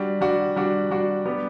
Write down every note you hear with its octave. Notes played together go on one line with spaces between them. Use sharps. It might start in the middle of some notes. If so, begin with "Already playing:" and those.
Already playing: G3 D4 F#4
G3 D4 F#4
G3 D4 F#4
G3 D4 F#4
G3 B3 D4 G4